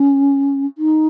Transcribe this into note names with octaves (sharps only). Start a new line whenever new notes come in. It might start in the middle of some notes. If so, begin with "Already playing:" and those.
Already playing: C#4
D#4